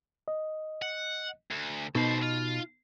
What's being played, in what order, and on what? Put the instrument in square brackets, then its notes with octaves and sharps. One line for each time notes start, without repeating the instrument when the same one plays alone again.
[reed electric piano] D#5
[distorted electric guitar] F#5
D2
[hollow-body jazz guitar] B2 [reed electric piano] D#4 [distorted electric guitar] A4 C5
[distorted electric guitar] F4